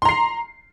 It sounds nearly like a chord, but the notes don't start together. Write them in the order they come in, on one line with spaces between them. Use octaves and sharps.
C6 A#5 C7